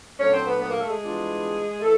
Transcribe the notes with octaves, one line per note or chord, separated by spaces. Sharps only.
A#2 F#3 A3 C#4 D4 C#5
C4 C5
B3 B4
B3 B4
A#3 A#4
A3 A4
G#3 G#4
E3 G3 B3 D4 F4
E3 A3 A4